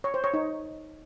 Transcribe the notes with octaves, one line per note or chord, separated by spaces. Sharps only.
C#5
C5
C#5
D#4